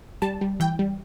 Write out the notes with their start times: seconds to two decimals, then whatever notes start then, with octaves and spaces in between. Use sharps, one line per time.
0.22 G3 A5
0.41 G3
0.60 E3 G5
0.79 G3